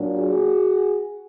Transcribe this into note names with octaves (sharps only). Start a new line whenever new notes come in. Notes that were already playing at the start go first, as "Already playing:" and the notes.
Already playing: A#2 F#3 A#3 D4
F#4 G#4